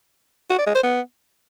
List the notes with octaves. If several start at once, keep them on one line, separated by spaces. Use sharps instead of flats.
F#4
D5
G#3
C5
B3